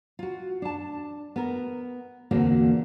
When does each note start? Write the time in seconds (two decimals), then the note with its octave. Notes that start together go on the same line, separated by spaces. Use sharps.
0.19 F4 F#4
0.62 D4 A5
1.36 B3 A#4
2.31 E2 A#2 D3 A#3 C4 F#4